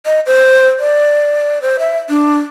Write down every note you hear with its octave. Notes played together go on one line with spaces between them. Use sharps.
D#5
C5
D5
C5
E5
D4